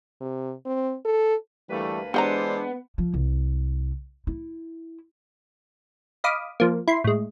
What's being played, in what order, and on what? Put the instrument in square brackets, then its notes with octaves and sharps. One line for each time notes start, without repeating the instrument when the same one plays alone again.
[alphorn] C3
C4
A4
[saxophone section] D2 A#3 B4 [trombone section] E3 G3 A3
[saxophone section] E3 C5 [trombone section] G#3 D4 [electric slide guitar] B3 [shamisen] G4 G5 A#5
[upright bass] F3
C2
E4
[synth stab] D#5 F5 B5 D6 D#6
F3 A#3
E4 C6
A2 G#3